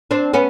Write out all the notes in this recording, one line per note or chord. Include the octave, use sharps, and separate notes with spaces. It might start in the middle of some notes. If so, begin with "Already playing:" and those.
C4 D4
B3 C#4